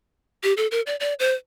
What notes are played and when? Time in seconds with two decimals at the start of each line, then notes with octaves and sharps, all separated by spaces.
0.43 G4
0.57 A4
0.71 A#4
0.87 D5
1.00 D5
1.19 C5